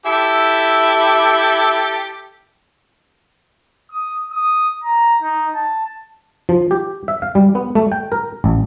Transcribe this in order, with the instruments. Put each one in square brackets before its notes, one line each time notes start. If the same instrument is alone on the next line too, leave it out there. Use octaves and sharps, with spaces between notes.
[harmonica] E4 G4 A4
[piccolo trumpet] D#6
D#6
A#5
D#4
A5
[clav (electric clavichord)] F3
G4
E5
F5
G3
B3
A3
G5
A#4
A1